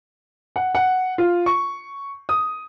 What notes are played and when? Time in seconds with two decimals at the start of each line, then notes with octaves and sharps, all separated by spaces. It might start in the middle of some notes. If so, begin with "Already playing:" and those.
0.56 F#5
0.75 F#5
1.18 F4
1.46 C#6
2.29 D#6